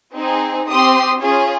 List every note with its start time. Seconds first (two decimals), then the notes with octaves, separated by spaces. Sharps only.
0.16 C4 D#4 G#4
0.69 C4 G4 C6 D#6
1.21 C#4 F4 G#4